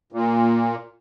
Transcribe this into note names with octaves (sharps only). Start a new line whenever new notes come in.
A#2